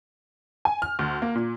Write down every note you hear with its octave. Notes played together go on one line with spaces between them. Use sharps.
G#5
F6
D2
A#3
A#2